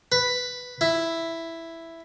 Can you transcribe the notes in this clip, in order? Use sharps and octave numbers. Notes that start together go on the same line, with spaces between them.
B4
E4